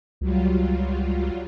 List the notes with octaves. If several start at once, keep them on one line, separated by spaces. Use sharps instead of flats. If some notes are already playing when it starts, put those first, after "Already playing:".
C#2 F#3 G3 F4